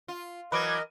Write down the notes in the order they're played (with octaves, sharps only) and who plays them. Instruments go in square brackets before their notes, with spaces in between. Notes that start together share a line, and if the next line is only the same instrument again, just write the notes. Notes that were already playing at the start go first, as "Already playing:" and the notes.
[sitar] F4
[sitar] E3 F#3 [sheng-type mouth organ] A#4 D#5 [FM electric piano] B4 D6 G#6